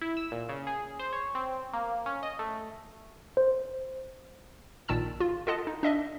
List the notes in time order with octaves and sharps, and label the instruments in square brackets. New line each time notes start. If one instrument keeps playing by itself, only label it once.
[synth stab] E4
E6
A#2
C#3
G#4
C5
C#5
C4
A#3
C#4
D#5
A3
[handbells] C5
[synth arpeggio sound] A#1 A#2 D#3 A5 E6 E7
F4
F4 A4 D#5 F#5 A5
D#4
D4 D#5 E5